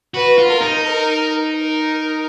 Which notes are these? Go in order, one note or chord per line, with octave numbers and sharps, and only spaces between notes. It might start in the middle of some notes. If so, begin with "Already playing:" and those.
F#4 B4
F4
A#4
D#4
A#4
A#4